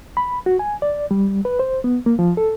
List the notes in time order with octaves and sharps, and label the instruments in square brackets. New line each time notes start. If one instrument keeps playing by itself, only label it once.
[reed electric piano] B5
F#4
G#5
D5
G3
B4
C5
B3
A#3
F3
A4